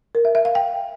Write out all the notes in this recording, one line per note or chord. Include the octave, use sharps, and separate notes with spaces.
A#4
E5
E5
F5
G5